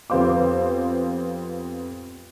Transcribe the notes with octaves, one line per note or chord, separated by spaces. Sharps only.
F2 B3 G4 C5 F5 D6